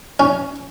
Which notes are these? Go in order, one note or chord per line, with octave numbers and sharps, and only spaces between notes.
C#4